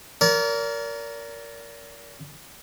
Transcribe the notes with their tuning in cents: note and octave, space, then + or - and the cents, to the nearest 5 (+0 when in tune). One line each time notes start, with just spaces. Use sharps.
A#4 +0 D5 -40